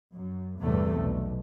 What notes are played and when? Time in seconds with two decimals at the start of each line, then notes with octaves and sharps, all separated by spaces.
0.12 F#2
0.60 G1 E2 A2 C3 G3 A3
0.95 B1